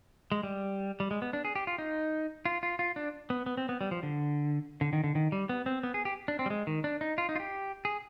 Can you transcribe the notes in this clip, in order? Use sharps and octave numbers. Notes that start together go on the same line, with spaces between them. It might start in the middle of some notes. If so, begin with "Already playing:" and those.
G#3
G3
G3
G#3
B3
D4
G#4
G4
F4
D#4
F4
F4
F4
D4
B3
B3
C4
B3
G3
F3
D3
D3
D#3
D3
D#3
G3
B3
C4
B3
G#4
G4
D4
C4
G3
G#3
D#3
D4
D#4
F4
D#4
F4
G4
G#4